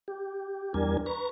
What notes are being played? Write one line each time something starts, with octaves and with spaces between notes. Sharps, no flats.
G4
E2 G3 D4 A#4 G#5
B4 A#5 C#6